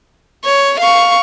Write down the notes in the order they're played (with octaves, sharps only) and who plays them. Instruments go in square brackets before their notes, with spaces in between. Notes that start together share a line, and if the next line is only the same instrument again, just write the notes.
[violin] C#5
F5 C#6